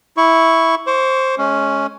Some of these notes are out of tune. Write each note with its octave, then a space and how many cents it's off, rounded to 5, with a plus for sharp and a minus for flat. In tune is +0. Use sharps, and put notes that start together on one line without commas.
E4 -5 C#6 +0
C5 +10 C#6 +35
G#3 +25 C#4 +0